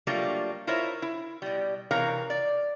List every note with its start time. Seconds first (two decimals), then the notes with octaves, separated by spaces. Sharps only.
0.07 F#3 G3 A3 A#3 D4 F4
0.67 E4 F4 A#4 C5 C#5 E5
1.02 E4
1.42 B2 G3
1.91 C3 E3 A#4 C#5 F5 A#5
2.30 D5